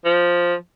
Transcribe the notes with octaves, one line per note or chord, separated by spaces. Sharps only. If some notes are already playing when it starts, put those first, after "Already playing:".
F3